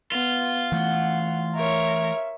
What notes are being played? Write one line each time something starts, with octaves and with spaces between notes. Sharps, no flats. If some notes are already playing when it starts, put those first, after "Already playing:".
B3 F4
E3 A3 F#5
A#4 C#5 E5